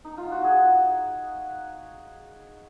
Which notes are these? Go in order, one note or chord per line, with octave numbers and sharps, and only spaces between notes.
D#4
F4
F#4
G#4